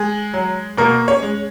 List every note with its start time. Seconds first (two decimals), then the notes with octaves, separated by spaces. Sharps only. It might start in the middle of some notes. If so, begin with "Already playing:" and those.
Already playing: G#3 G#4
0.34 F#3
0.78 B2 A#3 A#4
1.08 C#4 C#5
1.23 G#3